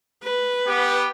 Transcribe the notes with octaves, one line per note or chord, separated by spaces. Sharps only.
B4
B3 G4